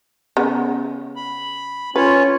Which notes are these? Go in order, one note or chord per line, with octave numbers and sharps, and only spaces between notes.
C#3 B3
B5
C#4 F4 B4 C#5